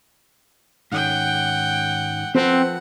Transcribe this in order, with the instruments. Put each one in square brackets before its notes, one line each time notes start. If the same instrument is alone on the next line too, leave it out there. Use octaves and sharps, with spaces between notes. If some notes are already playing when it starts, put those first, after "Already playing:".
[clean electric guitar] G#2 D#3 C#4 [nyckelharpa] F#5 G5
[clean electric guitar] F3 A4 B4 [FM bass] C4 [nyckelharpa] F#5